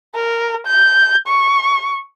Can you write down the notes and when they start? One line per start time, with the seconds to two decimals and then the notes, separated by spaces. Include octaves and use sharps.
0.15 A#4
0.66 G6
1.27 C#6